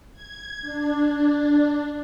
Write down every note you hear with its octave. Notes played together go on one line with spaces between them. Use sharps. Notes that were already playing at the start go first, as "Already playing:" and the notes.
G#6
D4